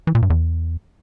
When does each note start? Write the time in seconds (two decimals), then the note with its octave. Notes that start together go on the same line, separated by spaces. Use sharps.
0.07 E3
0.15 A#2
0.22 G2
0.30 E2